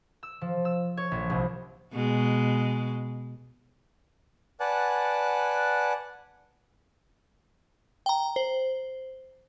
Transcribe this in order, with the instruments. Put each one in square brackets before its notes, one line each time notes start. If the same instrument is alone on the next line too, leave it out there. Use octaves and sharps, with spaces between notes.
[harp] E6
F3
E6
C#5
A#1
C2
[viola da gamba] B2 G#3
[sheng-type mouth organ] B4 D5 F#5 G#5 A5 F#6
[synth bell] G5 A#5
C5